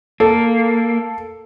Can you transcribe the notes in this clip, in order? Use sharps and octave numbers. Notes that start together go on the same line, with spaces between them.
A#3 A4